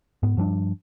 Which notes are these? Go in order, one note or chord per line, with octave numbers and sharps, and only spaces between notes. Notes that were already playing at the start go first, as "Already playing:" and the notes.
G#2 B3
G2 F3 G3 D4